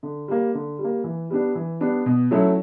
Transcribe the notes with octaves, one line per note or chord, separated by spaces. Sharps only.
D3
G3 A#3
D3
G3
A#3
E3
G3 B3 D4
E3
G3 B3 D4
B2
F#3 A3 C#4 E4